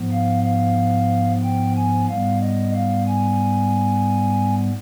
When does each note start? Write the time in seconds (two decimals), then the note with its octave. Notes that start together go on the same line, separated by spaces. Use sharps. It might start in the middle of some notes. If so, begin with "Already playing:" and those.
Already playing: G#2 F3 B3
0.12 F5
0.44 F5
1.43 G5
1.76 G#5
2.08 G#2 G3 B3 F5
2.41 D#5
2.74 F5
3.07 G#5